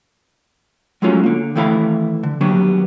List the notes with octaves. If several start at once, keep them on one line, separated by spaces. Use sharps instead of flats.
F#3 G#3 A3 C#4 F4 F#4
D3 A#3
D#3 E3 A3 E4 F5 B5
D3
D#2 F#3 G3 B3 D4